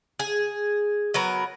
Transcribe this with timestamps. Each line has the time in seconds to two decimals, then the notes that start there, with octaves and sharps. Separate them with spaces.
0.19 G#4
1.14 F#3 B3 A#4 B4